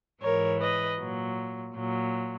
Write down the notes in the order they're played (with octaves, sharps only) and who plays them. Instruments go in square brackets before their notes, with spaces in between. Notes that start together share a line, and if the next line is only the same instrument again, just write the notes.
[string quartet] G#2 E3 A#4 C#5
B4 D#5
A#2 F#3
A#2 F#3